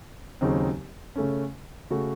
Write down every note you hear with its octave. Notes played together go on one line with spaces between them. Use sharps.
D#2 C#3 F#3 C4 D#4
C#3 A3 C#4
C#3 A3 C#4 F#4